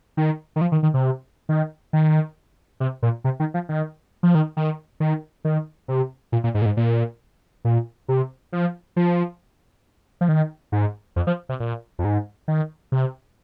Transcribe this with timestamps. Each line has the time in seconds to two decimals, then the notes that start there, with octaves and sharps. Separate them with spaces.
0.17 D#3
0.56 D#3
0.61 F3
0.72 D#3
0.83 D#3
0.94 C3
1.49 D#3
1.93 D#3
2.80 C3
3.03 A#2
3.24 C3
3.40 D#3
3.54 F3
3.69 D#3
4.23 F3
4.35 D#3
4.57 D#3
5.00 D#3
5.45 D#3
5.88 C3
6.32 A#2
6.44 A#2
6.54 G#2
6.62 A#2
6.66 G#2
6.77 A#2
7.65 A#2
8.08 C3
8.53 F3
8.96 F3
10.21 F3
10.29 D#3
10.72 G#2
11.16 F2
11.27 F3
11.49 C3
11.60 A#2
11.99 F2
12.05 G#2
12.48 D#3
12.92 C3